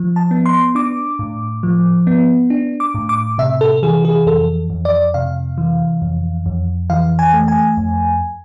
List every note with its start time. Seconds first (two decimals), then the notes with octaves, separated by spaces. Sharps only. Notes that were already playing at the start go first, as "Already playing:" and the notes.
Already playing: F3
0.16 A5
0.31 B3
0.46 C6
0.75 D4 D6
1.19 A2
1.63 F3
2.07 B3
2.50 D4
2.80 D6
2.95 A2
3.09 D6
3.38 C3 E5
3.61 A4
3.83 E3 G#4
4.05 G#4
4.26 F2 A4
4.70 F2
4.85 D5
5.14 C3 F5
5.58 E3
6.02 F2
6.46 F2
6.90 E3 F5
7.19 G#5
7.33 A3
7.48 G#5
7.77 F2